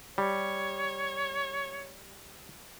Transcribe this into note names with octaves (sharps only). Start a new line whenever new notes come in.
G3 C#5